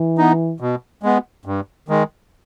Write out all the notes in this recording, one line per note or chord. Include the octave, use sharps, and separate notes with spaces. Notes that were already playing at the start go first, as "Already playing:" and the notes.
Already playing: E3
B3 D#4
B2
G#3 B3
G2
D#3 G#3